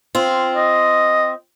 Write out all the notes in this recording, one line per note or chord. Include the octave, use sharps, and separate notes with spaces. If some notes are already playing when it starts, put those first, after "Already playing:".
C4 F4
D#5